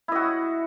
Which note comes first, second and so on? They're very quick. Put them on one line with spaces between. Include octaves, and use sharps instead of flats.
E4 D#5 F#4